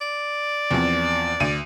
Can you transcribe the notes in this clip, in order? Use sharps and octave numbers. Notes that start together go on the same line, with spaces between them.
D5
E2 F3 C4
D2 D#7